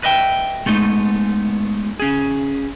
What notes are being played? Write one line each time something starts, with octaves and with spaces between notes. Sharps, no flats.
B4 D#5 E5 G5
G#3 A3 B3 D#4
C#4 G#4